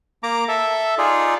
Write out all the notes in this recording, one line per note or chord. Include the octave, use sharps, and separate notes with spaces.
A#3 A#5 D6
A4 E5
D#4 F4 G#4 D5